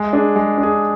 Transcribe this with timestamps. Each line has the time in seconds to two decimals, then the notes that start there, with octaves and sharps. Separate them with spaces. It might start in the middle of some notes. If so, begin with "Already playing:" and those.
Already playing: G#3
0.13 D4 G#4
0.36 G#3
0.58 D4
0.63 G#4